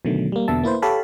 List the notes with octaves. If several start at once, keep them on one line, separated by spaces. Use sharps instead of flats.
B2 D3 D#3 F#3 A3
G3 A#3
E2 B2 D3 B3 E5 A5
A#3 E4 B4 C5
G4 A4 C#5 F5 A5 B5